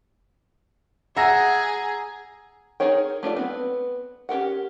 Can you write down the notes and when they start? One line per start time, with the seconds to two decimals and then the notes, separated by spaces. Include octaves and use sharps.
1.17 G#4 E5 F#5 A#5 E6 A#6
2.80 D#4 G#4 A#4 C#5 G5
3.23 A3 D4 F4 D5
3.36 B3 C4 B4
4.29 C#4 G4 A#4 F#5